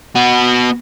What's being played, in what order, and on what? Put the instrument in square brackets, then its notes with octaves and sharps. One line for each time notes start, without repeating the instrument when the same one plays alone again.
[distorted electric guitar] B3 F#4